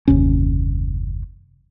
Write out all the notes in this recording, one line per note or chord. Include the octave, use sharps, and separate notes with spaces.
F#1 D#2 C3 C#4